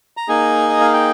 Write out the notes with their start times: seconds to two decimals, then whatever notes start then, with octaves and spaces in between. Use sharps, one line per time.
0.17 A#5
0.28 A#3 D#4 G#4 G#5
0.69 D#5
0.81 F5
0.93 G5